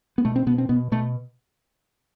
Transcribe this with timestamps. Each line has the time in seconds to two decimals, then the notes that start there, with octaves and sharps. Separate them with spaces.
0.18 B3
0.25 B2 A3
0.36 C4
0.46 B2 B3
0.58 C4
0.69 B2 B3
0.92 B2 A3